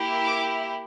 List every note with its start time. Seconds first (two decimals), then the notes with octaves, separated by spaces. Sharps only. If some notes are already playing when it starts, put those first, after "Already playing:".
Already playing: A#3 E4 G4
0.24 D6